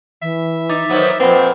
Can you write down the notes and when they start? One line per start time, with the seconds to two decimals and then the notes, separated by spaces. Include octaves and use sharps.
0.22 E3 E5
0.69 D#4 D6 A6
0.90 D#3 F#3 B3 C5
1.20 F2 A#2 C4 B4 C5 F#5 B5